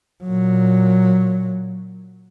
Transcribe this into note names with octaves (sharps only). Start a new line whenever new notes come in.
A#2 F#3